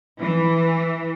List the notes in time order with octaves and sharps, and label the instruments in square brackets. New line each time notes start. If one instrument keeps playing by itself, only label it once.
[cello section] E3